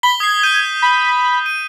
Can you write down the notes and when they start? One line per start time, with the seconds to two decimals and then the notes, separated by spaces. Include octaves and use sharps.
0.03 B5 B6 G7
0.20 D#6 G#6 C7
0.43 G6 D#7
0.82 B5
1.46 D#7